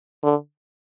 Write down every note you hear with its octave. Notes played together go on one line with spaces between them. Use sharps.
D3